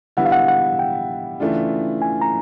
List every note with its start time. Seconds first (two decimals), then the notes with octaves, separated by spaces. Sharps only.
0.17 D3 G3 B3 E4 F#5
0.25 F5
0.32 F#5
0.48 F#5
0.79 G5
1.40 C#3 E3 A3 D4 F4
2.02 G#5
2.22 A#5